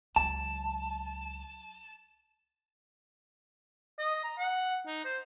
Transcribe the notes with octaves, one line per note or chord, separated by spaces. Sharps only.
C#2 F#3 A5
D#5
A#5
F#5
D#4
C5